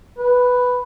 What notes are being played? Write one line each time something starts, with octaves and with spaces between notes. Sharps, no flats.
B4